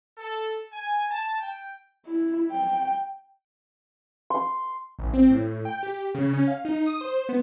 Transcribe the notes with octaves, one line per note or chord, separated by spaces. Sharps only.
A4
G#5
A5
G5
E4
G5
C6
A1
C4
A2
G5
G4
C#3
C#4
F5
D#4
D#6
C5
B3